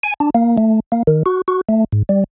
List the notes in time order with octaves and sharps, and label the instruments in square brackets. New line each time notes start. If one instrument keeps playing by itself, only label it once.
[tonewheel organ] G#5
D4
A#3
A3
A#3
D#3
F#4
F#4
A3
G#2
G3